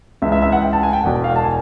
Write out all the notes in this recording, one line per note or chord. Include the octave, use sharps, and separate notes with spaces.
C#2 C#3 E3 E5
E5
E5
F#5
G5
A5
G#5
G5
E1 E2 B2 F#5
F5
A5
G#5